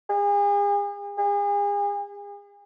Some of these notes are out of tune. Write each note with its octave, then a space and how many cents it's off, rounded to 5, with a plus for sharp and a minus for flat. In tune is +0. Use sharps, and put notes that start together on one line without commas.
G#4 -40
G#4 -40